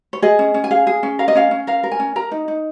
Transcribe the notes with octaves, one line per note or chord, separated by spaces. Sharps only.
C#5
G#4 D#5
C#4
C#4
G#5
G#4 F5
G#4
C#4
A#4 F5
D#5
C#4 F5
C#4
A#4 F5
A#4
G#5
C#4
A#4 A#5
D#4
D#4